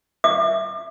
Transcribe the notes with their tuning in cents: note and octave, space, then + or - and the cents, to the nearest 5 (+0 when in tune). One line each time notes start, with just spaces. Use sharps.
E5 +0 D6 +40